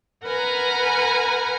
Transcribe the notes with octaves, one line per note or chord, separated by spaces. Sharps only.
A#4 B4 F#5 G#5 A#5